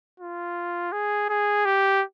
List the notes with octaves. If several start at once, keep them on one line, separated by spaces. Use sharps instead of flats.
F4
G#4
G#4
G4